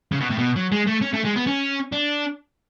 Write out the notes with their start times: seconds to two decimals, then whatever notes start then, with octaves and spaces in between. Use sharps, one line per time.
0.12 C#3
0.20 B2
0.30 A2
0.38 B2
0.56 F#3
0.72 G#3
0.86 A3
1.01 C#4
1.13 A3
1.24 G#3
1.35 B3
1.47 C#4
1.92 D4